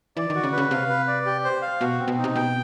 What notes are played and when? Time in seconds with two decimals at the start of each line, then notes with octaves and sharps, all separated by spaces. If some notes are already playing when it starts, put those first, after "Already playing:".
0.17 E3 D5
0.30 D#3
0.35 F#4
0.43 C#3
0.52 B4
0.58 C#3
0.71 C3 F5
0.89 B4
1.07 D5
1.26 G4
1.44 C5
1.62 F5
1.81 B2 F#4
2.00 C4
2.08 B2
2.18 D#4
2.24 C3
2.35 B2 G5